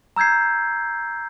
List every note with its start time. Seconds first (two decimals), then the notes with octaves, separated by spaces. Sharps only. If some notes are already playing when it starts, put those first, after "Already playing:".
0.16 A#5 E6 G6 G#6 C7